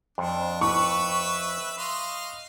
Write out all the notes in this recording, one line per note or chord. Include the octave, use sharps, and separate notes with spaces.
F2 D4
B4 E5 C#6
D#5 F5 C6